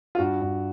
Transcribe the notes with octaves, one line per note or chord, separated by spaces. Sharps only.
F4
G2 F#4
G2